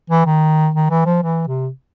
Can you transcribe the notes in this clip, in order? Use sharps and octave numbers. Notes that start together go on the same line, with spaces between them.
E3
D#3
D#3
E3
F3
E3
C3